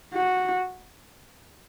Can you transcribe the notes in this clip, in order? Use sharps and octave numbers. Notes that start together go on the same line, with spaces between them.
F#4